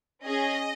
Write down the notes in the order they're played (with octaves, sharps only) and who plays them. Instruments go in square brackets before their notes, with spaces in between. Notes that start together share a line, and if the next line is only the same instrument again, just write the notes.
[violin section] C#4 G#4 D#5